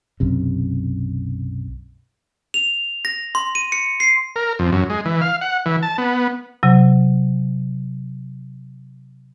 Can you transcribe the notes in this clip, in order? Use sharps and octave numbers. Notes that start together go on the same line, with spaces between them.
B1 F#2 C3
F7
A#6
C6
D#7
C#7
C7
A#4
F2
F#2
G#3
E3
F5
F#5
E3
A5
B3
C3 F#3